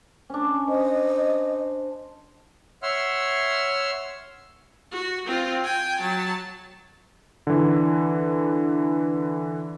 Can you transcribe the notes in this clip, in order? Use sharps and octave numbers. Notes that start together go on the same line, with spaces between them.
C#4 D4
C5 D#5
C#5 E5 F#5 C6 E6 F6
F#4
C4 F4
G5 G#5
F#3 A5
D3 E3